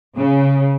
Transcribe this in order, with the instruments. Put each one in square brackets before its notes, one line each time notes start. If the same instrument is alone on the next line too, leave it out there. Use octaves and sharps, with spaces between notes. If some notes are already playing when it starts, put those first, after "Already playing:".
[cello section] C#3